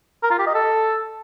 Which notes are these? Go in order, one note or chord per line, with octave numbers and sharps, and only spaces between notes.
A#4
F4
G4
D#5
A4